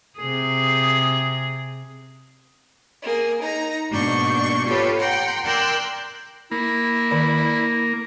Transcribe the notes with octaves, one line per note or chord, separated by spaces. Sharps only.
C3 G#4
A#3 G#4
D#4 A#5
G#2 B2 A#3 D4 C#6 G6
F4 G4 A4 B4 C#5
F#5 G5 A#5 C6
A#4 D5 G5 C6 E6 F#6
A#3 E4
D#3 D5